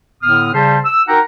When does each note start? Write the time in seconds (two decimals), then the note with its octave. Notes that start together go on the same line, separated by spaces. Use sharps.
0.23 A2 D3 B3 D#6 F6
0.54 C#3 G3 C5 A5
0.85 E6
1.08 D#4 F#4 A#4 F#5 G5 A#5